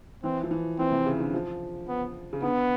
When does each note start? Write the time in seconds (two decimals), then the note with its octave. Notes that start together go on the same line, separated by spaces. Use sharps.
0.23 E3 C4
0.43 F3
0.51 E3
0.79 E3 C4
0.92 C3
1.06 C#3
1.20 D3
1.34 F3
1.88 B3
2.33 C#3
2.42 D3 B3